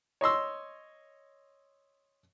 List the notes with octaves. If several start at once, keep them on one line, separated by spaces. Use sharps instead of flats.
C#5 D#5 C6 E6